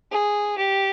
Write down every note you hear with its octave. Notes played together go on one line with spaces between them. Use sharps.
G#4
G4